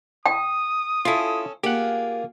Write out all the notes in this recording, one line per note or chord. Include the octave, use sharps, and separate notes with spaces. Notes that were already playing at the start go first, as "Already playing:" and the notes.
G5 D#6
C#4 E4 F4 A4
A#3 F4 G4 G#4 F#5